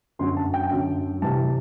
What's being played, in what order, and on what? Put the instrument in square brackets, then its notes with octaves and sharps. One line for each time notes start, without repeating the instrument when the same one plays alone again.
[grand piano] F#2 D3 F#3 C6
A5
G5
F#2 D3 F#3
C3 E3 G3 A5